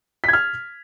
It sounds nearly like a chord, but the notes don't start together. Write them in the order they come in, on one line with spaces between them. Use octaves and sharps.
B6 G#6 F6